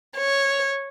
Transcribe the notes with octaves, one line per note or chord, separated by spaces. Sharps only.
C#5